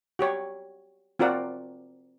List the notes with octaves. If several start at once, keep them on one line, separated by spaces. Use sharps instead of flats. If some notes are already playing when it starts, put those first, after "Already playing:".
F#4 G4 C#5
C4 F4 F#4 A#4 D5 F#5